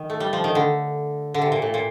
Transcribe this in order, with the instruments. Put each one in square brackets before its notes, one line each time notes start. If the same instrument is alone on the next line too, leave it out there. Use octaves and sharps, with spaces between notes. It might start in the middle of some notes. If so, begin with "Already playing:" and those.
Already playing: [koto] D#3
A3
G3
F3
D#3
D3
D3
C3
A#2
A2
A#2